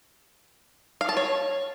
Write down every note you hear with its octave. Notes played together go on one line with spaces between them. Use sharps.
F5
A5
C#5